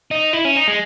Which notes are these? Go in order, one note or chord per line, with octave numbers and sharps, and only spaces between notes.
D#4
E4
C#4
D#4
G#3